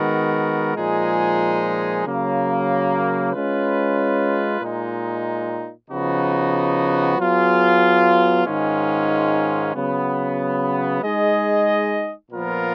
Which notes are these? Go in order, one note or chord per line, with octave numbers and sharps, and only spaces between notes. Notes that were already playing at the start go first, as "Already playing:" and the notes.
Already playing: D#3 G#3 B3 F#4 A#4
A#2 F3 G#3 D#4 G#4
C#3 F#3 A#3
G#3 C#4 F4 B4
A#2 G#3 D#4
C#3 F3 B3 D#4 F#4
F#3 B3 F4 G#4
G#2 D#3 G#3 C#4 F4
C#3 F#3 B3
G#3 D#4 G#4 D#5
A#2 F3 B3 F4 A#4